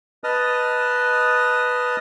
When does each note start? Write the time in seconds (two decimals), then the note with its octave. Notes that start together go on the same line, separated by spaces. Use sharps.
0.24 B4 D#5 A5 D#6 F6